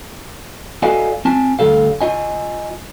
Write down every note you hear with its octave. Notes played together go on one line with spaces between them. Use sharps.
F#4 A4 D5 D#5 F5 G#5
C4 G#5 A5
D2 G3 A4 F5
F4 D#5 G#5